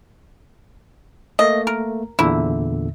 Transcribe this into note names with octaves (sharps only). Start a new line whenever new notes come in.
A3 A#3 D#5
A#4
E2 A#2 D3 E4